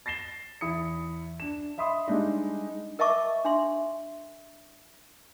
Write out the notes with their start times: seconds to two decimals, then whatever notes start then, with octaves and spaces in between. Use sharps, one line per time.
0.06 A6 A#6 C7 E7 G7
0.61 E2 E4 D#6 C#7
1.40 D4 E7
1.78 D#5 E5 B5 C6 D#6
2.08 G3 G#3 D4 D#4
2.99 A#4 D#5 E5 A5 C#6 D6
3.45 D4 E5 C6